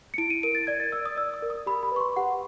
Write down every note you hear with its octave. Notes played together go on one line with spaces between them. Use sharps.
C#7
E4 D7
D#7
A#4 D7
A6
D5 G#6
A6
D5 E6
D#6
D5 E6
D#6
A#4
D#6
G4 B5
B5
B4 C#6
C6
G4 F#5